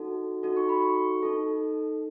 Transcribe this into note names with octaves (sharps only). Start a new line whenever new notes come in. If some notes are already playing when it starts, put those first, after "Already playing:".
Already playing: D#4 F#4 A4
D#4 F#4 A4
C#6
B5
C#6
D#4 A4